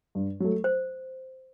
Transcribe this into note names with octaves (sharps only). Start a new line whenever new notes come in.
G2
F#3 A3
C5